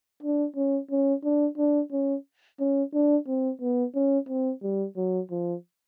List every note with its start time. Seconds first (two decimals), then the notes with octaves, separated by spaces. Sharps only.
0.22 D4
0.56 C#4
0.91 C#4
1.24 D4
1.58 D4
1.92 C#4
2.59 C#4
2.93 D4
3.27 C4
3.61 B3
3.95 C#4
4.29 C4
4.63 G3
4.96 F#3
5.31 F3